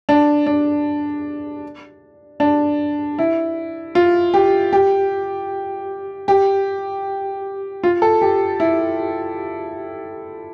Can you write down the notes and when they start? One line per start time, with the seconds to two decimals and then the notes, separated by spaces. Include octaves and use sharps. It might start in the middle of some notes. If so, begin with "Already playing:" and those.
0.09 D4
0.46 D4
2.40 D4
3.19 E4
3.95 F4
4.34 G4
4.73 G4
6.28 G4
7.83 F4
8.02 A4
8.22 G4
8.60 E4